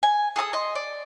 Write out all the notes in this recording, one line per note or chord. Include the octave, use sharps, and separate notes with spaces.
G#5
G#4 A4 A5 D#6
D#5 C6
D5